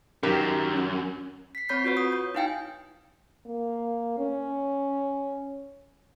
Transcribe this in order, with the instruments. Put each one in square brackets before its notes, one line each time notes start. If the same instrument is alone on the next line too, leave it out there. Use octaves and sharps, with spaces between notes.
[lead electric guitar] F#2 [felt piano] D#3 G4 A#4
[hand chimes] B6 C7
C4 C#5 B5 G6 B6 C7
F4 F#4 B4 C#5
D#6
G6
D#4 E4 F5 G5 G#5
[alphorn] A#3
C#4